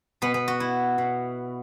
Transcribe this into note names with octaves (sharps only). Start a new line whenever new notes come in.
B2 B3
B3
F#4
E4
B2